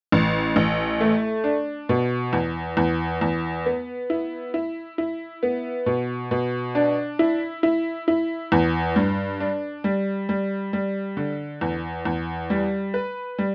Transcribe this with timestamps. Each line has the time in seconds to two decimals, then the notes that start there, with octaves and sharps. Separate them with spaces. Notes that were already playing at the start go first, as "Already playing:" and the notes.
0.12 A1
0.56 A1
1.01 A3
1.44 D4
1.89 B2
2.33 E2
2.77 E2
3.21 E2
3.66 B3
4.10 E4
4.54 E4
4.98 E4
5.43 B3
5.86 B2
6.31 B2
6.75 D4
7.19 E4
7.63 E4
8.08 E4
8.52 E2
8.96 G2
9.40 D4
9.84 G3
10.29 G3
10.73 G3
11.17 D3
11.61 E2
12.05 E2
12.50 G3
12.94 B4
13.38 G3